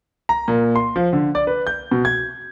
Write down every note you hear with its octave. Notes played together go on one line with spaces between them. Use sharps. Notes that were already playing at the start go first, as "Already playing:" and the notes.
A#5
A#2
C6
F3
D3
D5
B4
G6
B2
G#6